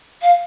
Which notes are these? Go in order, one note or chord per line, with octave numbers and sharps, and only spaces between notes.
F5